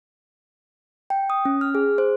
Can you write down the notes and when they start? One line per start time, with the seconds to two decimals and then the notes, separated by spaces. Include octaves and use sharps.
1.10 G5
1.30 D#6
1.45 C#4
1.61 F6
1.75 G#4
1.98 C5